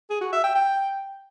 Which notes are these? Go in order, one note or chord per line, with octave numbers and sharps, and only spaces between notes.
G#4
F#4
E5
G5
G5